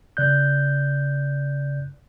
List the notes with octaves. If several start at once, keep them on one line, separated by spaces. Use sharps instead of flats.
C#3 D5 F#6 G6